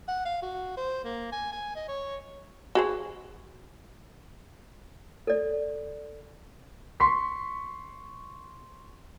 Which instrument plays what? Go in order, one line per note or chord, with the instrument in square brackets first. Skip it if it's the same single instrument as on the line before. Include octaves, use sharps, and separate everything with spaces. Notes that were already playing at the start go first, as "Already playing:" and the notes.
[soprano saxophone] F#5
F5
F#4
C5
A#3
G#5
G#5
D#5
C#5
[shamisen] F#4 G#4 C5
[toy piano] A4 D5
[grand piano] C6 C#6 B6